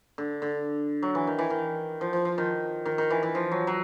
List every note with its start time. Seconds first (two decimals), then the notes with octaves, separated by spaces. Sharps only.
0.18 D3
0.42 D3
1.02 F#3
1.15 E3
1.27 D#3
1.39 E3
1.50 D#3
2.01 F3
2.13 F3
2.25 F3
2.38 D#3
2.86 D#3
2.98 D#3
3.10 E3
3.23 E3
3.35 F3
3.52 F#3
3.67 F#3